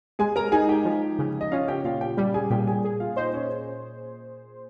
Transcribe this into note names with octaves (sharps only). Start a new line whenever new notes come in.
G#3 G#4 G#5
A#4 A#5
D#4 G#4 G#5
G4 G5
F3
C#3
D#5
C#4 F4 F5
G4 G5
A#2 F4 F5
G4 G5
G3 G4 G5
G#4 G#5
A#2 G4 G5
G#4 G#5
G#4
F4 F5
D#4 C5 D#5
C#4 C#5